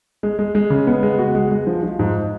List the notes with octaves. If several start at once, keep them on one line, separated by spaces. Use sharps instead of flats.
G#3
G#3
G#3
C#3
B3
G#3
F#4
G#3
G#3
F3
F3
G#2